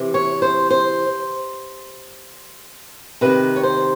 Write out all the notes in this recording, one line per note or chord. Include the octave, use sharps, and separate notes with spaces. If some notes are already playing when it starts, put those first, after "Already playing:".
Already playing: C3 E3
C#5
C5
C5
C3 D#3 B4
C#5
C5